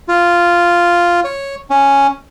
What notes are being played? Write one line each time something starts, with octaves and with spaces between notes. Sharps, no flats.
F4
C#5
C#4